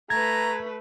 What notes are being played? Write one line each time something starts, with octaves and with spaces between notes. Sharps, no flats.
A3 B4 A#5 G#6